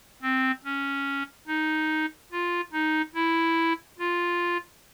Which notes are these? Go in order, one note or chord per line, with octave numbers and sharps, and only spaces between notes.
C4
C#4
D#4
F4
D#4
E4
F4